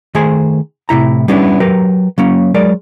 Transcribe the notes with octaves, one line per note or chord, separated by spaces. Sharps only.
D#3 A3 G#4 C5 G#5 C6
A2 C3 E4 A#5
G3 B3 C#4 D4 E4
F#3 G4 A#4 B4
F#3 A#3 C#4
F#3 G#3 A#4 D5